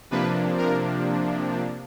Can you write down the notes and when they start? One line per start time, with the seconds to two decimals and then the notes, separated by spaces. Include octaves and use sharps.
0.11 C3 F3 A#3 D4 B4
0.58 A#4